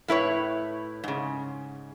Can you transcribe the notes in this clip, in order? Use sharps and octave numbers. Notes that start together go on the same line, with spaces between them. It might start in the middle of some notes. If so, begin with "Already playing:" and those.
A2 E4 B4 C#5
G#2 C#3